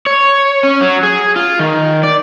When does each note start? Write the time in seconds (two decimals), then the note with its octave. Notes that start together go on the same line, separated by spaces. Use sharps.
0.06 C#5
0.63 C#4
0.81 F#3
1.03 G#4
1.36 F4
1.59 D#3
2.03 D5